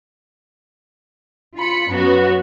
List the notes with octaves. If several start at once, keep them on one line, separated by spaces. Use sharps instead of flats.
F4 B5 C#7
F#2 B3 F#4